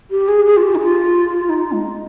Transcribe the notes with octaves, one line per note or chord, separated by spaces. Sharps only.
G4
G#4
G#4
F4
G4
D#4
F4
D#4
G#3